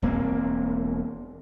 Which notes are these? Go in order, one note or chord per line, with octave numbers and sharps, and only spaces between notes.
E1 A#3 C4